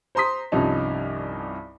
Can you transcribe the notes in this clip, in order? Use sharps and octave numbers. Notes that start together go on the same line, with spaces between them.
C5 A#5 C6 D#6 B6
C2 G2 F3 C#4 D#4 A5